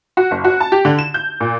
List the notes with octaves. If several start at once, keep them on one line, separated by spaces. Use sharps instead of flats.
F#4
F#1
F#4
A5
G4
D3
E7
G6
A#2